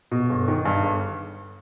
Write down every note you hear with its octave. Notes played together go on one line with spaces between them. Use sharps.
B2
G1
D#3
G2
G1